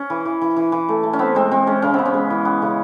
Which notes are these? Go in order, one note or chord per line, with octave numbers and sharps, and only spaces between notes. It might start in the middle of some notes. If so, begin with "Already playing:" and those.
Already playing: C#4
E3
E3
E3
E3
E3
A3
A3
C#4
B3 C4
G#3 C4
G#3 C4
G#3 C#4
C#3 C#4
B3 C4
C#4
G#3
E3
B3
C#3